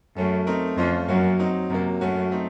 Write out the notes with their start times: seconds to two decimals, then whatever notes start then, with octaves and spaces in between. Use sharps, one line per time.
0.16 F#2 A3 C#4 A4
0.47 A3 C4 D#4 A#4
0.78 F2 A3 C#4 F4 C5
1.09 F#2 F#3 A#3 C#4 F#4
1.39 F#3 C4 D#4
1.70 F#2 C3 F#3 A#3
2.01 F#2 A3 C#4 F#4
2.31 A3 C4 D#4